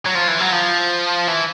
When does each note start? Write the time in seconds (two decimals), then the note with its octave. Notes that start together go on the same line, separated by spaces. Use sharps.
0.06 F#3
0.15 F3
0.28 E3
0.40 F#3
0.52 F3
1.28 E3